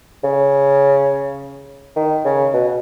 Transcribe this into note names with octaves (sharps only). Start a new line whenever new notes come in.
C#3
D#3
C#3
B2